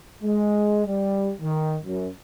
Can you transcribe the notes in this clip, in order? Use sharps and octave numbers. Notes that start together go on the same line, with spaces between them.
G#3
G3
D#3
F#2